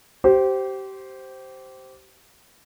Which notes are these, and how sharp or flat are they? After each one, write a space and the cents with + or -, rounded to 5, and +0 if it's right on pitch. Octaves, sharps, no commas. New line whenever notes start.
G4 -25 C5 +0